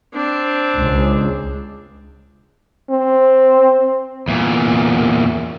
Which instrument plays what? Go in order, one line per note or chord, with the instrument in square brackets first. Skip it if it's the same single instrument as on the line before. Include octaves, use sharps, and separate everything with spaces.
[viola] C4 D4
[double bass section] C#2
[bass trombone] C4
[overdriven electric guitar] E2 A#2